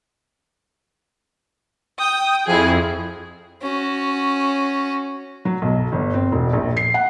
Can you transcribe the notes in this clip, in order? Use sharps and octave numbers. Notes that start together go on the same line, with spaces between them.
G5 D#6
F2 E4 G#4
C#4 F#4
F#3
B1
G1
C4
E1
A#1
C7
F#5